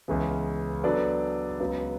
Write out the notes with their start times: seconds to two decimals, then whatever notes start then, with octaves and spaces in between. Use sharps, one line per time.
0.08 C#2 C#3 E3 B3
0.84 F#3 B3 D4 A4 D5
1.60 C#2 C#3 F#3 B3